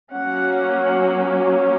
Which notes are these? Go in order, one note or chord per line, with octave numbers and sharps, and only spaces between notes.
F#3 A#3 C#4 F#5
F#5